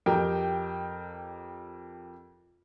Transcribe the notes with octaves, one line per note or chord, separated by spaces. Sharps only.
F2 G4 A#4 G5